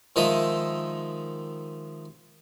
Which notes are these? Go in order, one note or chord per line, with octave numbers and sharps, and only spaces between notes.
D#3 F3 G#3 D#5 E5